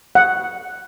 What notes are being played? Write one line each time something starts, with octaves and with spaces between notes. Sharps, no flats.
F#5